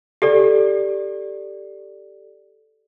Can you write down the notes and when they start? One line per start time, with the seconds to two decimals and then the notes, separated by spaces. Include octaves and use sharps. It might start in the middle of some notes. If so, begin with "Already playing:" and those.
0.22 G4 A4 D5